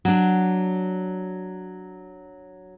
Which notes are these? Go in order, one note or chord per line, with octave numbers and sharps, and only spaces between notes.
F#3 D4